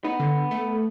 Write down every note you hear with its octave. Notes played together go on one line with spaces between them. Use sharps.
B3 D#4
D3
A3